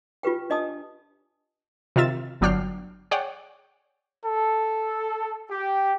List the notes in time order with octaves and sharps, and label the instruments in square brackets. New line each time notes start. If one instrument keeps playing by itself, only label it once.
[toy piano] F4 G4 B4 G5
D4 D#5 A5 D#6
[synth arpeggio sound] C3 D#3 F4 E5 A6 E7
G1 F#3 D4 G5 F6 C7
G#4 C#5 D5 F#5 G5
[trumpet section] A4
G4